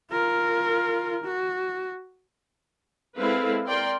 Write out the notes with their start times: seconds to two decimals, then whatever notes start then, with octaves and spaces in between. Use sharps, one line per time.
0.11 F4 A#4
1.25 F#4
3.17 G#3 C4 E4 A4 B4 F5
3.67 A#4 D5 G5 C6